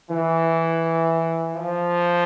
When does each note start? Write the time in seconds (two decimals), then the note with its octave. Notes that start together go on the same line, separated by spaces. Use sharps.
0.11 E3
1.56 F3